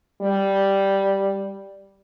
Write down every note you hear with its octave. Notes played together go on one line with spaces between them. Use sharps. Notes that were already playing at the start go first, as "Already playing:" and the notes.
G3